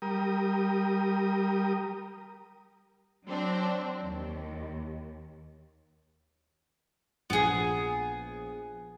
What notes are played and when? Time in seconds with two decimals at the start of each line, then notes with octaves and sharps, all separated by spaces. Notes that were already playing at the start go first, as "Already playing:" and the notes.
0.02 G3 A#4 D#6
3.26 F#3 C4 D4
4.03 D#2
7.30 A#1 B3 G#4